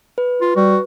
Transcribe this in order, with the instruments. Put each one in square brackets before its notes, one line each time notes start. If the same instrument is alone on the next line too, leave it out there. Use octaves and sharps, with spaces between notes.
[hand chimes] B4
[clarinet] F4
[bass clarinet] G3 [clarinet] F#4